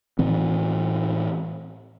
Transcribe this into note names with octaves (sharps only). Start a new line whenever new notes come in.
A2 E3 C4